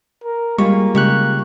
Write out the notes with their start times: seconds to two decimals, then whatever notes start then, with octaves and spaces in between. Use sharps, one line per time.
0.24 A#4
0.58 G3 G#3 A#3 F4 G#4 C#6
0.95 C#3 G#3 G4 C#6 F#6